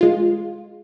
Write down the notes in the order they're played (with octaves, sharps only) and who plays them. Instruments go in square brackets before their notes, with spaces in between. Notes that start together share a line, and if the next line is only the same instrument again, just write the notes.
[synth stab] G#3 F4